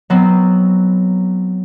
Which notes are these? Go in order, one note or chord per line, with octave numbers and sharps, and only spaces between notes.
F#3 B3 C4